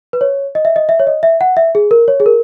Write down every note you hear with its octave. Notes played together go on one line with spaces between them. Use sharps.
B4
C#5
D#5
E5
D#5
E5
C#5
D#5
E5
F#5
E5
G#4
A#4
C#5
G#4
A#4